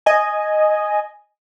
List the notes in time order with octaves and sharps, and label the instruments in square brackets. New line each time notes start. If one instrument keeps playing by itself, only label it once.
[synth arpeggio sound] D#5 G#5